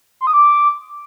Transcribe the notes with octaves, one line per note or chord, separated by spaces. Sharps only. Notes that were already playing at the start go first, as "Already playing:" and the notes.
C6
D#6
D6